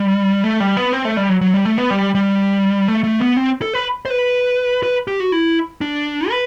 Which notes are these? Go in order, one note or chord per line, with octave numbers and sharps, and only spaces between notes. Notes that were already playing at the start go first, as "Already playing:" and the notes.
Already playing: G3
A3
G3
B3
C4
A3
G3
F#3
F#3
G3
A3
B3
G3
G3
A3
A3
B3
C4
A4
B4
C5
B4
B4
G4
F#4
E4
D4
B4